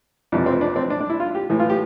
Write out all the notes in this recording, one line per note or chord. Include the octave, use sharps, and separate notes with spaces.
F2 C3 E3 D4
C4
D4
C4
D4
D4
E4
F4
G4
A2 E3
F4
G4